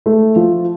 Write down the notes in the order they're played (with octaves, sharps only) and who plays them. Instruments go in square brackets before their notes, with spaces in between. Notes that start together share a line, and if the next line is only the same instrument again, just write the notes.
[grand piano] A3
F3